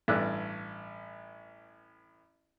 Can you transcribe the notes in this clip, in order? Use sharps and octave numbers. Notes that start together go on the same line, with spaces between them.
A1 G2 A3 D5 E6 F#6